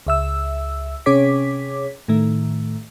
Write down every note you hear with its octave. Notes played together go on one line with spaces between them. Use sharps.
C#2 E5 E6
C3 C#4 G#4 C#5 D6 B6
A2 D#3 A3